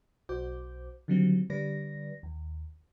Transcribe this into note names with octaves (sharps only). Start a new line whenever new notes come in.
B1 F#4 C5 D6 G6
D3 D#3 F#3 G3 C4
D3 G3 B4 D5 A#6
D#2